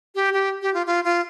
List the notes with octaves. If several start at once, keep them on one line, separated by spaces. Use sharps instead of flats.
G4
G4
G4
F4
F4
F4